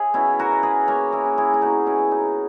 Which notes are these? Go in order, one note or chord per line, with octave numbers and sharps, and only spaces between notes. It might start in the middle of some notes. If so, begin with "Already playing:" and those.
Already playing: G#4 C#5 E5
B2 C#4 E4
F#4 A#4
B2
G#4 B4
A#3 A#4 C#5
E4 G#4
C#4
E4 G#4
E4
B2 D#4 F#4
C#4 E4
B2
D#4